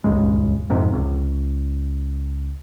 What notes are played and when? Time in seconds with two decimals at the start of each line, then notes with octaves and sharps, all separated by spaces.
0.04 D#1 C#2 G2 G#3
0.70 F2 G#2 C3
0.93 C#2